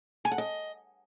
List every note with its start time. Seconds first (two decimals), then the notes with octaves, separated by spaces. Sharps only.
0.25 G#5
0.32 F#5
0.38 D#5